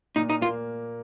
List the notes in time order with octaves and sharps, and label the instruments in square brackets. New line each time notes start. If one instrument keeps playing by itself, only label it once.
[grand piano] A#2 [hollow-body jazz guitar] D#4
[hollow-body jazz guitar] D#4
[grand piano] A#3 [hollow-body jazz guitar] F4